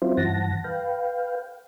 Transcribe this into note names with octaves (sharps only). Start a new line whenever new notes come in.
F#3 C4 E4 F4 C5
G2 E3 F#5 A5 A#6
B4 F5 G5